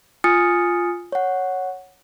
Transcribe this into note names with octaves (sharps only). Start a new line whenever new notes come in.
F4 G#5 D#6 F6 A6 C#7
C#5 F#5